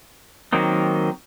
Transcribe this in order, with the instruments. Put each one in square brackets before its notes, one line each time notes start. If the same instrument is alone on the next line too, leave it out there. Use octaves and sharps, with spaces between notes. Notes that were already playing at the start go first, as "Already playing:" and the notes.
[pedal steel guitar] D#3 F#3 A#3 C4 D#4